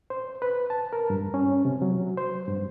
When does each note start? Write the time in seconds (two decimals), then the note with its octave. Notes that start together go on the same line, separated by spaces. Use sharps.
0.10 C5
0.42 B4
0.70 A5
0.93 A#4
1.10 G2
1.34 C#4
1.65 C3
1.82 F#3
2.17 C5
2.47 G2